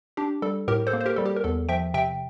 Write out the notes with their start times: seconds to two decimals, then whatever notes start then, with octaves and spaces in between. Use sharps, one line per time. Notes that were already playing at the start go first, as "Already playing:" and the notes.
0.17 D4 G4
0.42 G3 A4
0.68 A2 G4 A#4
0.87 A4 C5
0.93 A#3
1.01 C5
1.06 G4 A#4
1.16 G3 A4
1.26 G4
1.37 A#4
1.44 E2 A4
1.69 F3 E5 G5
1.94 C3 E5 G5